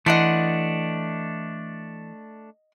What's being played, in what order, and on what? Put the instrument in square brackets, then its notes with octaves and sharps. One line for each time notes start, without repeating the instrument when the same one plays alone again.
[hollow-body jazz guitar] E3 [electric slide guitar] A3 D4 [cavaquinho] D#5 F#5 C6